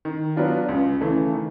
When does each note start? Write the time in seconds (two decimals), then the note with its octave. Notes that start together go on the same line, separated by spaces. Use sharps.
0.05 D#3
0.36 F#3 B3 D4 F4
0.69 C#2
1.01 C#3 E3 A3
1.33 D#3